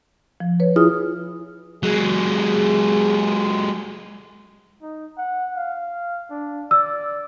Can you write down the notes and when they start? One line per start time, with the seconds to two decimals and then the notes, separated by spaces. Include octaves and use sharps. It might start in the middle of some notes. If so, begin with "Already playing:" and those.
0.40 F3
0.60 B4 C#5
0.76 E4 F4 G#4 D#6 F6
1.83 F#3 G#3 G#4
4.82 D#4
5.18 F#5
5.56 F5
6.31 D4
6.71 D5 E6